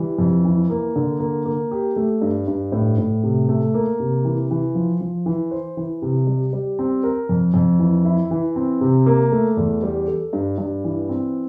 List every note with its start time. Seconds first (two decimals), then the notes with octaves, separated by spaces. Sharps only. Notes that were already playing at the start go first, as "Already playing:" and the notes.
Already playing: E3 G3
0.19 F2
0.45 E3
0.70 A#3
0.96 D3
1.20 A#3
1.46 A#3
1.71 G4
1.96 A3
2.22 G2
2.48 G2
2.72 A2
2.98 A2
3.23 C3
3.49 A3
3.74 A#3
4.00 C3
4.25 E3
4.51 E3
4.75 F3
5.00 F3
5.26 E3
5.51 C5
5.77 E3
6.02 C3
6.27 G3
6.53 G3
6.79 C4
7.03 A#4
7.29 F2
7.54 F2
7.80 E3
8.05 E4
8.31 E3
8.56 C4
8.81 C3
9.06 A#3
9.32 A3
9.57 E2
9.83 G3
10.07 A4
10.33 G2
10.58 G2
10.84 E3
11.09 C4